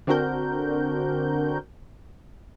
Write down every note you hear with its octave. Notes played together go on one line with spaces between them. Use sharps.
D3 C4 D4 F#4 A#4 G6